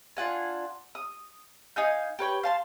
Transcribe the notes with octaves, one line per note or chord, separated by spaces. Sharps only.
D4 F4 F#5 G#5
D#6
D#4 F5 G#5 G6
G4 B4 C#5 G5
F5 A5 C6